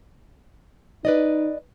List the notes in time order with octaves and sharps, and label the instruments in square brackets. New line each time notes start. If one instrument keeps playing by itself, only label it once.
[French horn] D#4 [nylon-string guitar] B4 D5 D#5